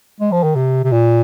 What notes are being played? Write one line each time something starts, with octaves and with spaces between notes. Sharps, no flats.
G#3
F3
D#3
C3
C3
A#2